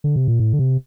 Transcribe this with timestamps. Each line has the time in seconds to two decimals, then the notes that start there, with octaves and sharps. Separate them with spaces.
0.04 D3
0.16 C3
0.28 A#2
0.40 A2
0.53 D3
0.59 C3